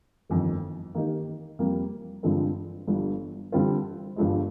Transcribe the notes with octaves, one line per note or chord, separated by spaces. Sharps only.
G1 F2 D#3
D#3 A#3 D#4 G4 A#4
F2 C3 G3 A#3
G2 D3 F3 G#3 C4
G1 G2 F3
D3 G3 C4 F4 C5
G1 G2 F3 G#3